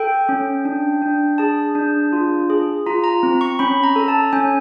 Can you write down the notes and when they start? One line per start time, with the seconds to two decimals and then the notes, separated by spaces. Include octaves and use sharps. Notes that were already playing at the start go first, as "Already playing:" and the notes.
Already playing: A4 G5
0.29 C#4
0.65 D4
1.02 D4
1.38 G#4 A5
1.75 D4
2.13 F4
2.50 G#4
2.86 F4 A#5
3.04 A#5
3.23 C4
3.41 C#6
3.59 C#4 B5
3.83 A#5
3.96 A4
4.08 A5
4.33 C#4 G#5